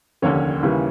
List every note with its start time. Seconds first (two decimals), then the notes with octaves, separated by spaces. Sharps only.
0.22 F1 D#2 D3 C#4 C#5
0.62 D#2 C#3 E3 G3